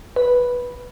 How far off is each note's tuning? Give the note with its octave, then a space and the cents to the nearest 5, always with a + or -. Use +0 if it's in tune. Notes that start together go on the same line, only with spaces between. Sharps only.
B4 -5